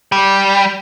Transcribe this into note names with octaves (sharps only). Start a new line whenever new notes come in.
G3